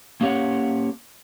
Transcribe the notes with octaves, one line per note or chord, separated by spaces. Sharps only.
A#3 C#4 G4 C#5 F#5